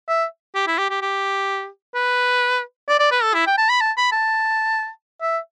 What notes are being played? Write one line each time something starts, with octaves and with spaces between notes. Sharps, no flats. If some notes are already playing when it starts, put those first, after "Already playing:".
E5
G4
E4
G4
G4
G4
B4
D5
D5
B4
A4
E4
G5
A5
B5
A5
B5
A5
E5